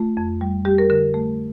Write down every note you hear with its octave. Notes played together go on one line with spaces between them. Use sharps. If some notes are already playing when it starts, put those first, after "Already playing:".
Already playing: A3 F4
F2
G3
G3 G4
A#4
D3 A#4
A3